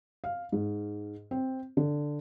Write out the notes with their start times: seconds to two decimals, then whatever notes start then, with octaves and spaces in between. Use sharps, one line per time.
0.24 F5
0.52 G#2
1.31 C4
1.77 D3